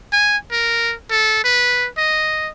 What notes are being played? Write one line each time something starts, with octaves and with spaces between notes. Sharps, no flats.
G#5
A#4
A4
B4
D#5